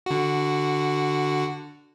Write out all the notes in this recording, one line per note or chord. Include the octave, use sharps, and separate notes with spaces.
D3 F#4